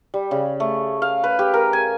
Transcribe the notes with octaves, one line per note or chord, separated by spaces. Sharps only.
G3
C#3
A3
F5
B4
G4
A#4
G#5